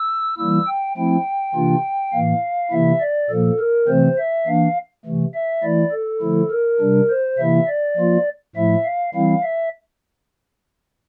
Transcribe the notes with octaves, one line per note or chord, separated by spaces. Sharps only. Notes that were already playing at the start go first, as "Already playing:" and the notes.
Already playing: E6
E3 G3 A#3 E4 E6
G5
F3 A3 C4 E4 G5
C3 E3 A#3 D4 F4
A2 E3 A#3 F5
C3 E3 A#3 E4 E5
D5
A#2 F3 A#3 A4
A#4
C3 E3 A3 C4 C5
E5
E3 A#3 D4 F5
C3 E3 A3
E5
E3 A3 E4 D5
A4
D3 F3 A3 E4
A#4
C3 G3 D4
C5
C3 E3 A#3 E4 E5
D5
F3 A#3 F4
A2 F3 A3 E4 E5
F5
E3 G3 C4 E4 F5
E5